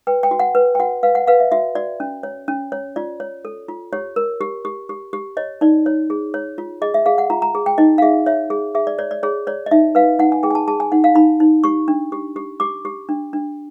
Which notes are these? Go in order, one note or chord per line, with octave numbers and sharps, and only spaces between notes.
B4 G5
G5
F#4
F#5
B4
G5
F#4 F#5
B4 F5
F#5
B4 F5
E5
F#4 E5
F#4 D5
C#4
C#5
C#4
C#5
F4 D5
C#5
A4
F4
G4 C#5
A#4
G4
G4
G4
G4
C#5 D#5
D#4 D5
C#5
G#4
C#5
F4
G#4 D#5
E5
G#4 F5
F#5
F4 A#5
A#5
G#4
G5
D#4 D#5
F5
G#4 E5
C#5 E5
G#4
G#4 E5
D5
C#5 D5
D5
G#4 C#5
C#5 D5
D#5
D#4 E5
B4 F5
D#4 F#5
G#5
G#4 G5
G#5
A5
G#4 A5
G#5
D#4 F#5
F5
D#4 B5
D#4
G4 C#6
D4
G4
G4
G4 D6
G4
D4
D4